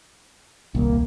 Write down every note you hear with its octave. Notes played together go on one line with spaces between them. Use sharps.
D#1 C2 A#3